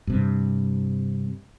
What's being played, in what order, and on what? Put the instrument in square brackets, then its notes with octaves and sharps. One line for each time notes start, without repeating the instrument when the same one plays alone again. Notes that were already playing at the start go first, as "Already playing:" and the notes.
[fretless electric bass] G2 C3